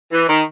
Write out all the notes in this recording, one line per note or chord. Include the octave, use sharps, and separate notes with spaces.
E3
D#3